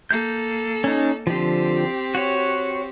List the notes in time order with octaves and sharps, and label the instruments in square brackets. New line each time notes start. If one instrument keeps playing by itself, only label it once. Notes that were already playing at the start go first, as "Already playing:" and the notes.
[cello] A#3 A4 [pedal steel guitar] G6
[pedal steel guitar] C#4 D#4
[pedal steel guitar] D3 F3 [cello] C4 G4
[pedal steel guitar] F#4 C#5